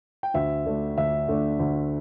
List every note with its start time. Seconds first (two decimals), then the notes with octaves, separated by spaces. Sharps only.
0.23 G5
0.34 D2 E5
0.66 D3 A3 D4
0.97 D2 E5
1.28 D3 A3 D4
1.59 D2